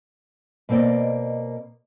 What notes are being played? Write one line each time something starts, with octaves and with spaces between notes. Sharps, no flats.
B2 A#3 C4 D5 D#5